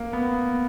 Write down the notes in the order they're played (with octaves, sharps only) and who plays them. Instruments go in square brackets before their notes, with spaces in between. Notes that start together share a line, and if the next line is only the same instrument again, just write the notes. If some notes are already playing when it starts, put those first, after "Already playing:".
Already playing: [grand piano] A#3
B3